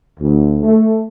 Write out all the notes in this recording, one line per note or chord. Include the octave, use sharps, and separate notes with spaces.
D2
A3